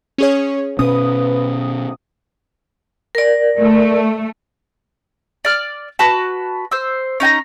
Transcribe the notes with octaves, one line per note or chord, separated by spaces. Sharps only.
C#4 G#4 C#5
B2 C#4 B4 D#6
A#4 D5
A3
D5 F6
F#4 B4 A5
C5 E6
C#4 D#4 G#5 A#5